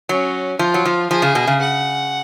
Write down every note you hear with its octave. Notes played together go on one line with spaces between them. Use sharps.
F#3 C#4
F3 F4
F#3
F3
F3 G#4
C#3
B2
C#3
F#5